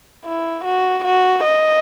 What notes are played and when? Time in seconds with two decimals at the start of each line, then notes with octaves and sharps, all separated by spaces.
0.26 E4
0.65 F#4
1.04 F#4
1.44 D#5